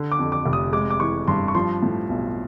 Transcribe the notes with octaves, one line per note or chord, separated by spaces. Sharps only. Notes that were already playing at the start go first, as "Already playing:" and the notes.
Already playing: D3
D6
F2
D6
F1
D#6
G#3 D6
D6
E3 C#6
G2 C6
C#6
F3 C6
A2
B1